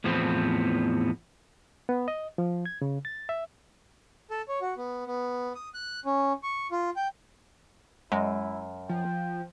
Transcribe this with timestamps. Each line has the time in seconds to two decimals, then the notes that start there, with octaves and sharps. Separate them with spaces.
0.04 E2 A2 F3 B3 C4
1.89 B3
2.08 D#5
2.38 F3
2.66 G#6
2.82 C#3
3.05 A6
3.29 E5
4.31 A4
4.48 C#5
4.61 F#4
4.77 B3
5.07 B3
5.55 D#6
5.74 F#6
6.05 C#4
6.43 C#6
6.72 F4
6.96 G5
8.12 F#2 G#3 E4
8.89 F3 G5